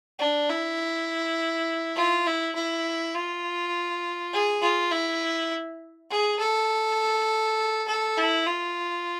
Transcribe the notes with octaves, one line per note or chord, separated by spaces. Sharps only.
D4
E4
F4
E4
E4
F4
G#4
F4
E4
G#4
A4
A4
E4
F4